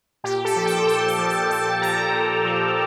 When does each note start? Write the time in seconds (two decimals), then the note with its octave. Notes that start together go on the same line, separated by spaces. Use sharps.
0.24 A#2 G4
0.45 A4
0.56 F3
0.66 G5
0.87 A#2 A5
1.08 A5
1.18 F3
1.29 A5
1.50 A#2 A5
1.81 F3 A#5
2.13 A#2
2.45 F3